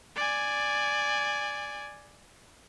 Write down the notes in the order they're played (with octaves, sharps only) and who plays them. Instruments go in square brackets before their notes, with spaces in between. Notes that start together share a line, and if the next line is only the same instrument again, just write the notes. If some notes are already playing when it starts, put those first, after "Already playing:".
[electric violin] D5 G#5